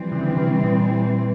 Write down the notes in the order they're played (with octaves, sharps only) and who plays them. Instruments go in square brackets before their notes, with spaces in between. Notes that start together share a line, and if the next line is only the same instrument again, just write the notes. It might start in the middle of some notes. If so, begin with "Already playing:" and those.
Already playing: [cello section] E3 G3 C4 [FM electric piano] F3
[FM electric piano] C#3
D3
C#3
C3
A#2